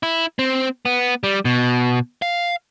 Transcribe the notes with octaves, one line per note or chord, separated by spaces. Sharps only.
E4
C4
B3
G3
B2
F5